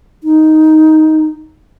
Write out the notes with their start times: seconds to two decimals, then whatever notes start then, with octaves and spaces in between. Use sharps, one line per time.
0.24 D#4